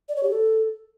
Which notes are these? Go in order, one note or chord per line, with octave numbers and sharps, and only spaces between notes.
D5
C#5
G4
A4